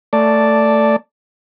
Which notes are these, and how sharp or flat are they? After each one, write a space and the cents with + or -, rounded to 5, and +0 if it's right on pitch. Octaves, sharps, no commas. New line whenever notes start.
A3 +15 D5 +0 A5 +0